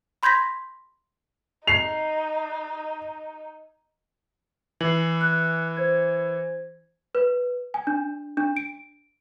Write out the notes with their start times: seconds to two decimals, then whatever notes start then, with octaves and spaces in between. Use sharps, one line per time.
0.23 B5 C6 G6 G#6 A#6 B6
1.67 D#4 C7 F7
4.81 E3 C7 F#7
5.21 F#6
5.77 C5 G#6
7.15 B4
7.74 G#5
7.87 D4
8.37 D4
8.57 D7